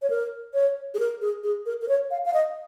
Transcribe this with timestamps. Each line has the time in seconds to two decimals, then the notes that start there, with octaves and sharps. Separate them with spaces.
0.02 C#5
0.10 A#4
0.54 C#5
0.94 G#4
0.99 A#4
1.22 G#4
1.44 G#4
1.66 A#4
1.82 A#4
1.88 C#5
2.11 F5
2.25 F5
2.34 D#5